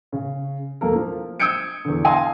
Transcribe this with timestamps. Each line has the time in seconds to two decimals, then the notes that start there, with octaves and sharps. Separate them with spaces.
0.12 C#3
0.81 E1 A#3 A4 A#4
0.96 F3
1.40 D#6 E6 G6 G#6 C#7 D7
1.85 E2 D3
2.05 D#5 F5 G#5 A5 C6 D#6